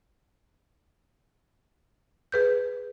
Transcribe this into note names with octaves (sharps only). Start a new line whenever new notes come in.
G#4 B4 G6